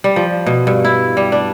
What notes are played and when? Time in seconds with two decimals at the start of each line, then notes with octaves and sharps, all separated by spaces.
0.04 G3
0.16 F3
0.46 B2
0.67 G2
0.85 E4
1.17 G3
1.32 D4